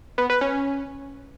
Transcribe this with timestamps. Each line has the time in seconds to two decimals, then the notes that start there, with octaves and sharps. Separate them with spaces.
0.18 B3
0.30 B4
0.41 C#4